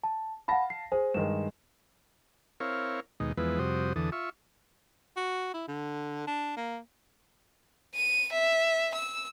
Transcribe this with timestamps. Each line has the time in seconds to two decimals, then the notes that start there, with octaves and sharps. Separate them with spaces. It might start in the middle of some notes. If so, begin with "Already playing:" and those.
0.04 A5
0.48 F5 F#5 A5 B5 A#6
0.70 C7
0.92 G#4 C5
1.14 G2 D#3 G#3 E7
2.60 C4 E4 A#4 C#5 F5
3.20 D#2 B2 G#3 D#4
3.37 E2 F3 G#3 B3 E4 B4
3.59 F2 C3 G3 F#4 C5 D#6
3.96 E2 D3 E3 A4 D#6
4.12 F4 E5 C#6
5.17 F#4
5.54 E4
5.68 D3
6.27 D4
6.57 A#3
7.95 D#7
8.33 E5
8.95 E6